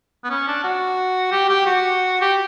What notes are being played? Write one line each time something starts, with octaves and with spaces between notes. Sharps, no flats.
B3
C#4
D4
F#4
G4
G4
F#4
G4